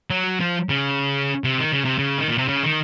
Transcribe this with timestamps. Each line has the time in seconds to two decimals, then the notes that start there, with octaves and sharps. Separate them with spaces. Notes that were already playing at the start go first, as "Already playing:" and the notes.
0.10 F#3
0.40 F3
0.69 C#3
1.44 C3
1.59 D#3
1.72 C#3
1.85 C3
1.98 C#3
2.18 D#3
2.29 A#2
2.38 C3
2.48 C#3
2.63 D#3